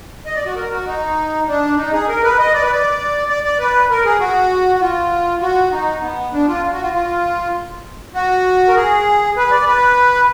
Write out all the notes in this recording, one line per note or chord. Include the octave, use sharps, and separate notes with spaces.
D#5
D5
F#4
A#4
F#4
D#4
D4
D#4
G#4
A#4
B4
D#5
D5
B4
D5
D5
D5
B4
A#4
G#4
F#4
F#4
F4
F#4
D#4
B3
D4
F4
F#4
F4
F4
F#4
A#4
G#4
B4
D5
B4